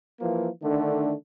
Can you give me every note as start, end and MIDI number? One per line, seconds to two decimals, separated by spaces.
0.21 0.48 52
0.21 0.48 53
0.21 0.48 58
0.63 1.13 50
0.63 1.13 51
0.63 1.13 57
0.63 1.13 62